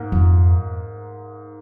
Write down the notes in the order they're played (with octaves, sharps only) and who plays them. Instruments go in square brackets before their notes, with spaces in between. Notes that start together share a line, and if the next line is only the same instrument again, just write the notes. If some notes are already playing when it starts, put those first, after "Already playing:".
Already playing: [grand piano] G#2 A#3
[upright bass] F2